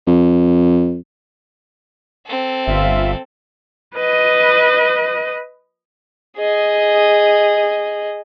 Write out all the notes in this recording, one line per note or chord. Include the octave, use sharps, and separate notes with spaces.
F2
C4 A4
G1 F4 E5
B4 D#5
G#4 D#5